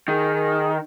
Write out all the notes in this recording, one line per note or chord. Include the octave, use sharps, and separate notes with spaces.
D#3 G#4